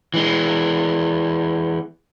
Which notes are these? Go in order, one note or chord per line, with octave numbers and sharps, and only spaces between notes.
E3 G#3